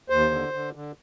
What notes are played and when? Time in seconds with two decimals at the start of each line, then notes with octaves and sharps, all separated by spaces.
0.09 D#2 C5
0.31 D3
0.53 D3
0.75 D3